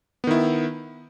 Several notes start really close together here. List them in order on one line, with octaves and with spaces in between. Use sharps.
B3 D#3 E4